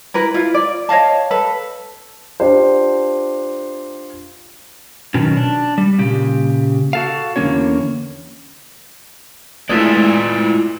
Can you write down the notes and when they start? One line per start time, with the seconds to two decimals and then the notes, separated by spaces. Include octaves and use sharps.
0.14 E4 A#4 B4
0.34 E4 F4
0.54 D5
0.89 C#5 D#5 F5 A5
1.31 A4 B4
2.40 D4 F4 G4 C5
5.14 B2 D#3 F#3 C#4
5.37 D4
5.78 G3
5.98 A#2 C#3 G4
6.93 F#4 A4 F5
7.36 E2 D3 F3 A#3 C#4 C#5
9.69 G#3 A3 E4 F4 B4 D5